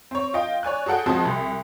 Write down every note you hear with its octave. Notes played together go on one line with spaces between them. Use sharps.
C4 C#5
F4 D#5 G5
C#5 D5 G#5 F#6
F#4 G#4 A4 F#5 G5
C#2 F3 C4 F#4 A5 D#6
C2